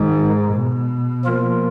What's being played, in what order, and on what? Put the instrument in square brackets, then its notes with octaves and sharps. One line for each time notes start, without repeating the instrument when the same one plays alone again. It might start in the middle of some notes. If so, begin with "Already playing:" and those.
Already playing: [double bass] G#2 [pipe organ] D#3 G#3 D#4
[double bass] B2
[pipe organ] F3 A#3 F4 A#4